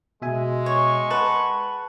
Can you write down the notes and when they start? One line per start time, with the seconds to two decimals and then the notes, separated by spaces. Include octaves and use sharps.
0.22 B2 G#3 E5 G#5
0.66 C#5 C#6
1.11 B4 F#5 A5